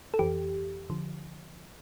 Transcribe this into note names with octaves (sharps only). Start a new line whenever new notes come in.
A4
F2 E3 G4
D3 F3